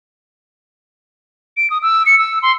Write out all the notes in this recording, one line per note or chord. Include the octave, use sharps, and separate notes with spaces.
D7
D#6
E6
C#7
E6
C6